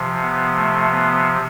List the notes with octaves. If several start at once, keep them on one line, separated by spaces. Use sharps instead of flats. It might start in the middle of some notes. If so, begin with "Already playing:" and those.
Already playing: C3 F3
B3
A3
B3